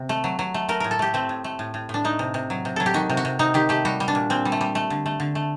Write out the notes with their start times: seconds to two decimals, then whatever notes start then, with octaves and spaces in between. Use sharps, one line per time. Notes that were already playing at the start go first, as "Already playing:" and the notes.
Already playing: C3
0.09 A3
0.24 F#3
0.39 F#3
0.54 A3
0.69 A3 A#4
0.80 A2 A#4
0.91 A4
0.99 A3 G4
1.14 A3 C4
1.29 A2
1.44 A3
1.59 A2
1.74 A2
1.89 A2 D4
2.04 A3 D#4
2.19 C3
2.34 C3
2.50 F#3
2.65 C3
2.76 F#3 A4
2.86 G4
2.94 D#3 F#4
3.10 C3
3.17 F#4
3.25 C3
3.39 C3 D#4
3.54 D#3 G4
3.69 A3 G4
3.85 G3 F#4
4.00 G3
4.08 D4
4.15 A#2
4.30 A#2 C4
4.45 G3
4.52 A3
4.61 G3
4.75 A3
4.90 D3
5.06 A3
5.20 D3
5.35 A3